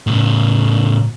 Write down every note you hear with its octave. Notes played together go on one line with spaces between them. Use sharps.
A2 C#3